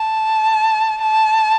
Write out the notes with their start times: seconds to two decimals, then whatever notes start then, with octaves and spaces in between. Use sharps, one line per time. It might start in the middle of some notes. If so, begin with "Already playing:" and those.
Already playing: A5
1.01 A5